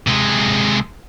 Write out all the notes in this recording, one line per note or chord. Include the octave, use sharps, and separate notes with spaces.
C3 G#3